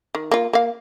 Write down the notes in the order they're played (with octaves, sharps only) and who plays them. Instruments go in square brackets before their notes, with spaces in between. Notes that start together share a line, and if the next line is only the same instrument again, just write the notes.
[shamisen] D#3
A#3 F4
A#3 F5